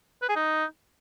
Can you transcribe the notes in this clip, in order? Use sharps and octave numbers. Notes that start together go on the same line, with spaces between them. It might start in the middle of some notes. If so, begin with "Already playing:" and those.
B4
G#4
D#4